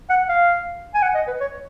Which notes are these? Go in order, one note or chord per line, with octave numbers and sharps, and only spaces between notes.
F#5
F5
G#5
F#5
D#5
B4
C#5